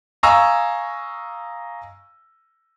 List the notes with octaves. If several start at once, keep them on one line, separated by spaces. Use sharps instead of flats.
D#5 F5 G#5 A#5 C#6 E6